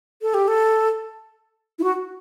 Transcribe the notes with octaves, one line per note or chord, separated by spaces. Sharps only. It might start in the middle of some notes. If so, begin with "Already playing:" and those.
A4
G4
A4
E4
F#4